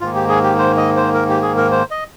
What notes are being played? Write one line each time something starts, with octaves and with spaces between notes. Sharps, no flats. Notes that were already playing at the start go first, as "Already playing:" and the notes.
G#2 D#3 A#3 F4
G4
G#4
G4
C5
D#5
C5
A#4
G4
G#4
A#4
C5
D#5